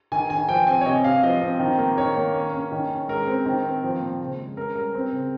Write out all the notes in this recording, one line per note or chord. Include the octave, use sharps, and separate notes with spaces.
D#3 G#5
D#3 G#5
F3 G5
C4 G#5
C#5
C3 D#5
C3 F5
F3 D#5
C4
D#3
A#3
D#3 C#5
A#3
C#4
C#4
D#3
C#4
G#3 A#4
C4
D#3
C4
F3
A#2
C#3
G#3
C#4 A#4
G3 A#4
C4
C#3